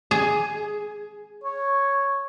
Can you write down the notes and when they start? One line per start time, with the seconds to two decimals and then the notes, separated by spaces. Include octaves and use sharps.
0.11 G#4
1.44 C#5